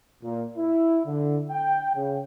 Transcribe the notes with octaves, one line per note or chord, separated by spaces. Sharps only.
A#2
E4
D3
G5
C#3